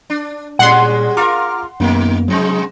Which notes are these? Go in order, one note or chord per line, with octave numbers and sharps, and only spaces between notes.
D4
A#2 G3 G#3 C#4 F#5 C6
F4 A#4 A#5 D6 F6
F#2 B2 D#3 A#3 B3
G#2 C3 F#3 G#3